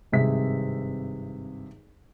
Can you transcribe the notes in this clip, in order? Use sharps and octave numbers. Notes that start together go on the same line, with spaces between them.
G#1 G2 C3 G#4 E5 B6